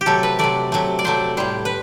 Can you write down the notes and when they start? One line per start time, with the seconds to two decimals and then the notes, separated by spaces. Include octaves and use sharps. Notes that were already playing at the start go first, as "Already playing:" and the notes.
0.01 G4
0.06 C3 F#3 A3 A4
0.23 B4
0.39 C3 F#3 A3 D5
0.72 C3 F#3 A3
0.99 D5
1.04 C3 F#3 A3 C5
1.37 A2 G3 C5
1.65 B4